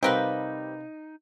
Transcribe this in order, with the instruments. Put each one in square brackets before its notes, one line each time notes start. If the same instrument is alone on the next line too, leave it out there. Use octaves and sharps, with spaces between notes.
[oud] C3 F5 [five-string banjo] G3 C4 [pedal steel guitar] D#4 [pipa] G4 A#4 B4